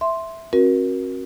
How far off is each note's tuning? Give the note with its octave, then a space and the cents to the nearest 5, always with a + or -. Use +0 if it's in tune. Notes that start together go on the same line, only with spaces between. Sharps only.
E5 +0 C6 +0
C4 +45 F#4 -10 A#4 +20